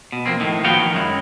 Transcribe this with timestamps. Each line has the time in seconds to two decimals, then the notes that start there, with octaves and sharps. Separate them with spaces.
0.12 B2
0.26 F2 A#3 C4
0.40 A2 D#3
0.64 D#2 F3 B3 F#4 F5 G5
0.80 D#3
0.93 F#2 G#3 E4